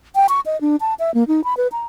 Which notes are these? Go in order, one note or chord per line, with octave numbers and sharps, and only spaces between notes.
G5
C#6
D#5
D4
A5
E5
A#3
D#4
B5
B4
A#5